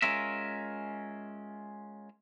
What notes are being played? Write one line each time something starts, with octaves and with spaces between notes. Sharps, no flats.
G#3 C#4 F4 A#4 E5